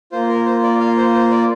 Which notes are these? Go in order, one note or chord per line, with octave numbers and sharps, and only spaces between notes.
A#3 F4 C5
A#4
C5
D5
F5
C5
C5
D5